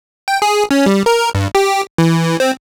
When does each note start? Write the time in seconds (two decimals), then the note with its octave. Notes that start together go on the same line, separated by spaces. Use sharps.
0.28 G5
0.42 G#4
0.71 C#4
0.86 G3
1.06 A#4
1.35 G2
1.55 G4
1.98 E3
2.40 C4